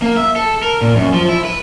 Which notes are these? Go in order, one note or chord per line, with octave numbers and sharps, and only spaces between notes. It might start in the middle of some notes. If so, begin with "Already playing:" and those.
A#3
E5
A4
A#4
A#2
F#2
F3
E4
B4